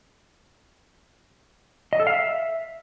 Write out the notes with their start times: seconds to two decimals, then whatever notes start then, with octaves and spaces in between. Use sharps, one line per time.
1.93 D#5
2.00 A4
2.07 F5
2.14 E5